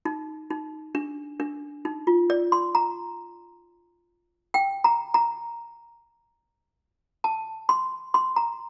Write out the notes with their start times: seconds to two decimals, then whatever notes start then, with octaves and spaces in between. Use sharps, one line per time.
0.05 D#4
0.50 D#4
0.95 D4
1.40 D4
1.85 D#4
2.07 F4
2.30 D5
2.52 C6
2.75 A#5
4.54 G5
4.84 A#5
5.14 A#5
7.24 A5
7.69 C6
8.14 C6
8.36 A#5